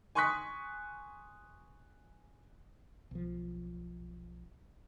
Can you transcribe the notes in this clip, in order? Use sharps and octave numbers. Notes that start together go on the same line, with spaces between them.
G#5 C6 C#6 D#6 F#6 B6
B1 F3